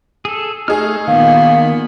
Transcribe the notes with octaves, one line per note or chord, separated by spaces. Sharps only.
G#4 A4
A3 D#4 G#4 F6
A#2 D#3 B3 F5